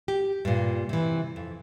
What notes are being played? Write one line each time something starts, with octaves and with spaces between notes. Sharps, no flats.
G4
G2 A#2
C3 E3
F2